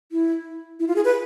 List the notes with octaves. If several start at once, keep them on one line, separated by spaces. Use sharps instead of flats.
E4
E4
F4
G#4
B4